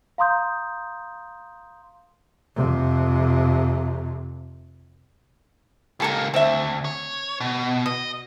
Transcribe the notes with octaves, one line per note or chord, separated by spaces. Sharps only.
F5 A#5 C6 D#6 G6
F2 C3
C#2 A#3 G4 A4 A#4
D2 C4 E5
C#5
B2
B2 D#5